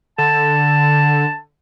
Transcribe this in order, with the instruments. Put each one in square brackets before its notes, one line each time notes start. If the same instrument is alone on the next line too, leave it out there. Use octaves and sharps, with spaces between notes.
[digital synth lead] D3 [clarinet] A5